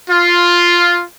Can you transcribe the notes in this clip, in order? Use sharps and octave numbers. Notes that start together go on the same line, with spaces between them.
F4